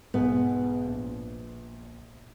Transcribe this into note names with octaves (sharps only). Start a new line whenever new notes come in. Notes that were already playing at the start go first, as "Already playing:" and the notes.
B1 G#2 G#3 B3
A#1